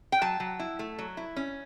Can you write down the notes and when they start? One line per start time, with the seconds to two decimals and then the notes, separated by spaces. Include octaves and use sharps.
0.12 G5
0.22 F#3 A5
0.40 F#3
0.60 E4
0.79 A3
0.99 F#3
1.17 E4
1.36 C#4